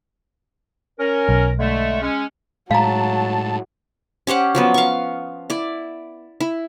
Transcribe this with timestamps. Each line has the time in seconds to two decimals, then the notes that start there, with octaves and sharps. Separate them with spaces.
0.99 C#4 A#4
1.29 B1
1.58 D3 G#3 A3
2.01 G#3 C#4
2.71 A2 F#3 G#3 F5 A5 A#5
4.27 C#4 G4 C5 F#5
4.55 F3 F#3 B3
4.74 F5 C#6
5.50 E4 D5
6.40 E4